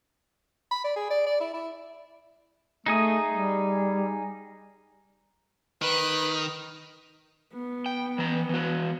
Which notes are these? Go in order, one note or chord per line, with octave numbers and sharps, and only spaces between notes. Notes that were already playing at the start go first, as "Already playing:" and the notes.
B5
D5
G#4
D5
D5
E4
E4
A3 D#4 G#4 D#6
G3
D#3 B4 F#6
B3
G5
E3 A#5
E3 F#4